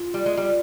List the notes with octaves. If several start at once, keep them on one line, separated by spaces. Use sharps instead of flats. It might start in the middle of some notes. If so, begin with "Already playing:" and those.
Already playing: F4
G3
G#3
G3